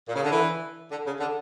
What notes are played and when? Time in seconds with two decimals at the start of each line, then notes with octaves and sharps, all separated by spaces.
0.07 A#2
0.15 C#3
0.23 D3
0.31 E3
0.90 D3
1.05 C#3
1.19 D3